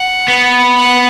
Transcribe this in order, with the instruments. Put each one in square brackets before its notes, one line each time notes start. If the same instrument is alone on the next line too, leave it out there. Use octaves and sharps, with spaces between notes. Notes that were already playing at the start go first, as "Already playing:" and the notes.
Already playing: [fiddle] F#5
[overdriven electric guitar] B3
[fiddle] F#5